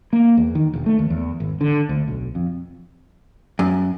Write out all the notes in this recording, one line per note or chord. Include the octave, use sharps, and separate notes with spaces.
A#3
E2
D#3
E1
A3
D#2
E2
G#1
D3
D2
B1
F2
F#2